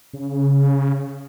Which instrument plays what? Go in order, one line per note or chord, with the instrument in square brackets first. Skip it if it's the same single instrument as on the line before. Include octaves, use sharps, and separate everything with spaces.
[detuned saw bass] C#3